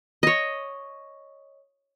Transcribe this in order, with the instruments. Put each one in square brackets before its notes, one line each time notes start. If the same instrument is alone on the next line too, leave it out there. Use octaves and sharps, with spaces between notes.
[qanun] C#5 D#5